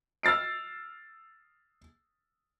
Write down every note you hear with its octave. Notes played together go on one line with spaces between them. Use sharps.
E6 F6 A6 C7 D7